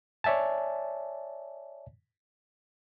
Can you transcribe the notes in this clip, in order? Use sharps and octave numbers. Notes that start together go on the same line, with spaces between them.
C#5 D5 E5 G#5 A5